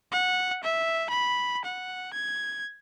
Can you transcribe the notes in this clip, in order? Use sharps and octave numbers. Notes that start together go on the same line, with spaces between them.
F#5
E5
B5
F#5
G#6